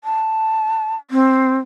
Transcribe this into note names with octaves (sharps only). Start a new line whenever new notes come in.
A5
C4